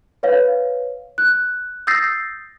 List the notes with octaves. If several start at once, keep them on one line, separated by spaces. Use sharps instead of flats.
B4 C#5 F5
F#6
D#6 E6 G6 A6 A#6 C7